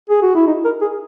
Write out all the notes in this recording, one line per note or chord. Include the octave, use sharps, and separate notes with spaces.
G#4
F#4
E4
D#4
A#4
G#4